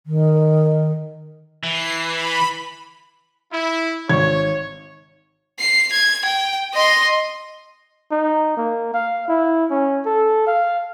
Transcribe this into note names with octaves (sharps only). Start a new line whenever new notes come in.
D#3
E3 C7
B5
E4
G#1 C#5 C#6 G#6
C7
G#6
G5
D#5 C6
D#4
A#3
F5
E4
C#4
A4
F5